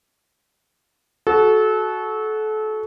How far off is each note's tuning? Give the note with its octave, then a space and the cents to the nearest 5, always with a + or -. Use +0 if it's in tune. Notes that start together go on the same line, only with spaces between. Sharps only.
F#4 +0 A4 -30